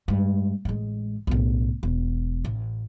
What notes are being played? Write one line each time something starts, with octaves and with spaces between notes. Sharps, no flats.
G2 G#3
A1 G#3
B1 A2
E1
A1